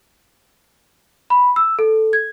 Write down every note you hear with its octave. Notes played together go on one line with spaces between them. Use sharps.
B5
E6
A4
G#6